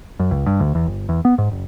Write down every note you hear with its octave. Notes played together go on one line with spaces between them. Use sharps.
F#2
C#2
G2
D2
E2
G1
E2
B3
G#2
F#1